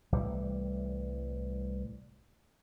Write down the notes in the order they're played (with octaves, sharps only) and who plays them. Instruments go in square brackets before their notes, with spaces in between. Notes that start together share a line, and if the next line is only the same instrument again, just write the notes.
[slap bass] C2 A2 E3 G3